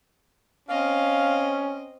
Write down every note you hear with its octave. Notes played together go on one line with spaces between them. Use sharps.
C4 C#4 D#5 F5